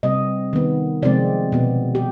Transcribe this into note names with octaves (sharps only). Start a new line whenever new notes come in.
C3 G3 C4 D#5
D#3 B3
C3 F3 G#3 C4 D5
B2 B3
G4